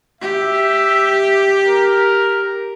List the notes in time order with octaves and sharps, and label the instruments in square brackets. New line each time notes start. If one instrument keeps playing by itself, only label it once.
[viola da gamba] G4 [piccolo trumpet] E5
[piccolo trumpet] A#4